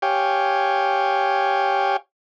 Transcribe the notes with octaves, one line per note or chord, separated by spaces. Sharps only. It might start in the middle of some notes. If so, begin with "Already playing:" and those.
G4 C#5 F5 G5 G#5